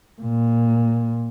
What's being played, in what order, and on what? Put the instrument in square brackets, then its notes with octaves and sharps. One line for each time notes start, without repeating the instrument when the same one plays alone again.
[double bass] A#2